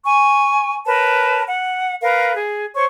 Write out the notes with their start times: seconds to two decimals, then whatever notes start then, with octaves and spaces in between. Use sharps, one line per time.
0.05 G#5 C#6
0.86 A#4 B4 C#5 A5
1.47 F#5
2.01 A#4 B4 F5
2.35 G#4
2.75 C5 C#5 C#6